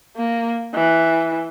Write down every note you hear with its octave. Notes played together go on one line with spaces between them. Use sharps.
A#3
E3